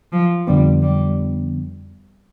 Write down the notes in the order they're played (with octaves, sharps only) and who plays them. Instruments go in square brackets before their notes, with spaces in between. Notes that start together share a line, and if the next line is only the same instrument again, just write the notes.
[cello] F3
[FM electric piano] F2 D3 F3 B3 [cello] G3
[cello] G3